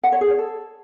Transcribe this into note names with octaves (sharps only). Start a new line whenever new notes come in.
F#5
C#5
G#4
C#5
A4